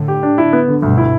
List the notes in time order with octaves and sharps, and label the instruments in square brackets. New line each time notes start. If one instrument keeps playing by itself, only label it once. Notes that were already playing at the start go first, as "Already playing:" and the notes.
Already playing: [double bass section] A2 D3
[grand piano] G4
D4
E4
B3
D3
[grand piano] D2 [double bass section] G2 B2
[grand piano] E4